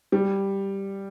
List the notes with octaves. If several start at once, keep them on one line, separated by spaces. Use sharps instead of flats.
G3